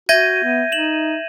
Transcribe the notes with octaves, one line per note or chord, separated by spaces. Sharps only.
F#4 E5 G6 G#6 A#6 D#7
B3
D#4 E7 F#7